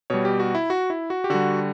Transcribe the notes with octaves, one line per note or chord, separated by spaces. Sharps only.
B2 G3 C#5
G4
F#4
E4
F#4
E4
F#4
G4
D3 G3 F#4